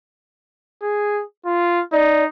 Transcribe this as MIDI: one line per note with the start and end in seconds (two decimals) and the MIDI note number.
0.82 1.22 68
1.45 1.81 65
1.93 2.26 63
1.93 2.23 74